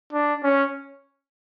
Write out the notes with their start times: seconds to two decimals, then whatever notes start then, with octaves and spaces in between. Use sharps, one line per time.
0.13 D4
0.43 C#4